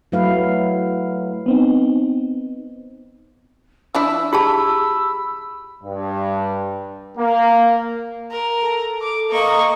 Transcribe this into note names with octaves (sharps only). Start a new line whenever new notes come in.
F#3 A3 E4 B4 F5
B3 C4 D#4
F3 D4 E4 E6
G4 G#4 A5 B5
G2
A#3
A#4
A4
D6
A#3 D#5 C#6